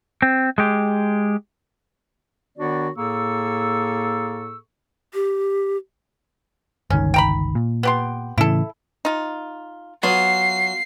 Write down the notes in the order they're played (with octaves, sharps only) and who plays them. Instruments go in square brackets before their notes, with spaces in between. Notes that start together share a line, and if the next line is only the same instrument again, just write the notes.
[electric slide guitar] C4
G#3 G4
[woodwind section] D#3 B3 D4 F#4 C#5 D5
A2 A#3 G#4 A4 C#6 E6
[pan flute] G4
[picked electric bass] G1 C#2 D#3 [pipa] C#4
[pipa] G5 A#5 B5
[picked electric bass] A#2
[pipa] B3 G4 C6
[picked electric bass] A2 C#3 E3 [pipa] E4 A4
[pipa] D#4 F4
[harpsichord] F#3 [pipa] B3 F4 [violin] C7